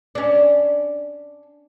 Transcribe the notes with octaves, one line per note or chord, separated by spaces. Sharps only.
C#4 D4